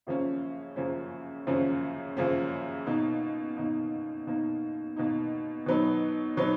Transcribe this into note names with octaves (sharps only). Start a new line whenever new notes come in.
F#2 C#3 F3 A#3 C#4
F#2 C#3 F3 A#3 C#4
F#2 C#3 F3 A#3 C#4
F#2 C#3 F3 A#3 C#4
B2 A#3 D#4
B2 A#3 D#4
B2 A#3 D#4
B2 A#3 D#4
B2 F#3 B3 D#4
B2 F#3 B3 D#4